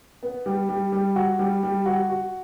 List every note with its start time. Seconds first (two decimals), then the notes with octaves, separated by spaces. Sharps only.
0.23 B3
0.46 G3
0.69 G3
0.92 G3
1.16 F#4
1.39 G3
1.63 G3
1.86 F#4
2.09 F#4